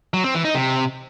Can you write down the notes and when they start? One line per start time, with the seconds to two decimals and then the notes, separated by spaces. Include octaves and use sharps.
0.14 F#3
0.24 C4
0.34 E3
0.44 D#4
0.55 C3